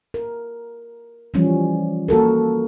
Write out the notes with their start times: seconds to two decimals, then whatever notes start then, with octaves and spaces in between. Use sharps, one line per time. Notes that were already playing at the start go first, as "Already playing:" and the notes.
0.14 A#4
1.34 E3 F3 G3 C#4
2.08 A#3 F#4 A4 A#4